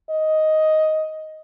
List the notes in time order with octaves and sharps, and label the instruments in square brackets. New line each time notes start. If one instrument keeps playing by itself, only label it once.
[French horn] D#5